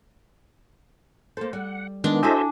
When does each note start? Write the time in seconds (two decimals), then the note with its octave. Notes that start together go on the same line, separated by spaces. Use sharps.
1.37 A#3 A4 C5
1.53 G3 F#5
2.04 D#3 G#3 B3 D4
2.23 E4 F#4 A4 C5 D#5 E5 G#5 A5